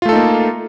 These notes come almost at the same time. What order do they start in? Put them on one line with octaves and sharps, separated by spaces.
F4 A3 A4 D#4 A#3